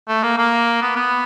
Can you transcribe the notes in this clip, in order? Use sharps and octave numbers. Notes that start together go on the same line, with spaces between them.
A3
A#3
A#3
B3
B3